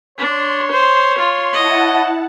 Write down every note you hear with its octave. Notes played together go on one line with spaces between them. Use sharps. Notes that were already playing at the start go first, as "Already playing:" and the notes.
D4 C#5 C6
C5
F4
E4 D#5 F#5 A5